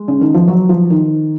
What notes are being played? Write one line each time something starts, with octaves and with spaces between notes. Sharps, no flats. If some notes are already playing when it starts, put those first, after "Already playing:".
Already playing: G#3
C#3
D#3
F3
F#3
F3
D#3